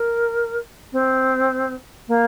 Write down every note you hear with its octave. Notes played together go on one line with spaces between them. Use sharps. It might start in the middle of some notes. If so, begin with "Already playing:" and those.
Already playing: A#4
C4
A#3